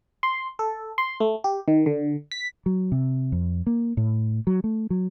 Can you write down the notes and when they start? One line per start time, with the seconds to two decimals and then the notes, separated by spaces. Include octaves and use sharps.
0.23 C6
0.59 A4
0.98 C6
1.20 A3
1.44 G4
1.68 D#3
1.86 D3
2.31 B6
2.66 F#3
2.92 C3
3.32 F2
3.67 A#3
3.97 A2
4.47 F#3
4.64 A3
4.90 F#3